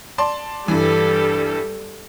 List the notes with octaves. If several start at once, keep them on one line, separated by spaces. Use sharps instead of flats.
D5 A5 C6
G2 E3 G3 A4